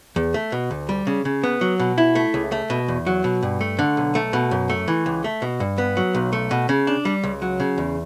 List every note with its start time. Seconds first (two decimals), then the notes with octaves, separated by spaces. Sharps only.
0.16 E2
0.34 A3
0.52 B2
0.71 D2
0.89 G3
1.07 C#3
1.25 C#3
1.44 B3
1.61 F#3
1.79 B2
1.98 E4
2.15 A3
2.34 C#2
2.52 A3
2.70 B2
2.88 E2
3.07 F#3
3.24 B2
3.43 G2
3.61 A3
3.79 D3
3.97 B1
4.15 A3
4.33 B2
4.51 F#2
4.70 A3
4.88 E3
5.06 C#2
5.24 A3
5.42 B2
5.60 G2
5.78 B3
5.97 F#3
6.15 B1
6.33 A3
6.51 B2
6.69 C#3
6.87 D4
7.05 G3
7.23 C#2
7.42 F#3
7.60 C#3
7.78 E2